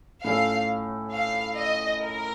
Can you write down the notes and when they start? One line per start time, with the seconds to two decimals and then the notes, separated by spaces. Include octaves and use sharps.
0.24 A2 A3 C#4 F4 A4 F5
1.13 F5
1.56 D#5
2.00 A#4